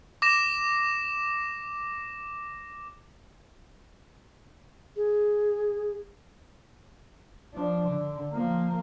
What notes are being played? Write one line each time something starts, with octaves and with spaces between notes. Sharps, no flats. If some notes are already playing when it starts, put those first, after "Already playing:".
D6 A#6 E7
G#4
F3 D4
D3
F3 A#3